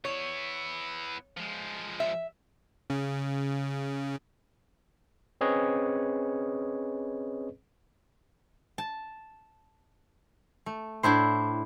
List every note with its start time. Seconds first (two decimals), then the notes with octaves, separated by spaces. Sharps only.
0.05 B3 E4 C#5
1.37 F3 G#3
2.00 E5
2.90 C#3
5.41 C4 C#4 G#4 B4 C#5 D#5
8.78 A5
10.66 A3
11.03 A2 D4 E4 C5